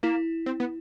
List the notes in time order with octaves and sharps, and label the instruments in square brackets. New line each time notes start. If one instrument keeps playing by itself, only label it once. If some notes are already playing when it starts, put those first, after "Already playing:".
[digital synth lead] A#3 [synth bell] E4
[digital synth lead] C4
B3